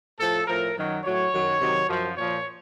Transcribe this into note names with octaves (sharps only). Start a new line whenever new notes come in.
A2 F3 A4
A2 F3 A#4
F#2 D#3 F#3
A2 F#3 C#5
F#2 D#3 F#3
C3 D#3 F#3
F#2 F3
A#2 F3 C#5